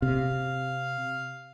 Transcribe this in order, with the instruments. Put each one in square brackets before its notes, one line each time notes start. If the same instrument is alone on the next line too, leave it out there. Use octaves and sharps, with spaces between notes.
[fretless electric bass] C3 [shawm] F5